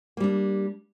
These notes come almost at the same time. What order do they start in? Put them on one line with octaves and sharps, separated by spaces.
A#3 G3 D4